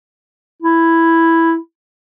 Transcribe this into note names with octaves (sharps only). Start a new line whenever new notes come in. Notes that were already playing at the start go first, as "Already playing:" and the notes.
E4